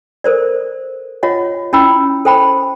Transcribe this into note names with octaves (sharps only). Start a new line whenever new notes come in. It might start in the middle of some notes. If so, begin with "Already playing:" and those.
A4 A#4 C5 D5
F4 C#5 D#5 F#5
C#4 E4 G5 B5 E6
A4 C5 G5 A5 B5